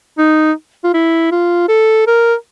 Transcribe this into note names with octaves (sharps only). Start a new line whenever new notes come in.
D#4
F4
E4
F4
A4
A#4